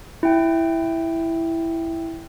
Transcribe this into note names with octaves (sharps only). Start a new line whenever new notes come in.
E4 G5